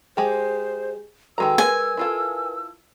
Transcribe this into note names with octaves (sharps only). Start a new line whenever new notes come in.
G#3 G4 G#4 C5
D#3 G#3 F#4 A4 B4 A#5 E6
G#3 A#4 B4 G#5
E4 F4 A4